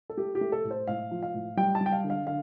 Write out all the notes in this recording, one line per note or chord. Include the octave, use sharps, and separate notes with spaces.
A4
A3 G4
G4
A3
A4
A2
C5
A2 F5
F3
F5
A2
G3 G5
A5
G3
G5
F5
D3
F5
D3 F5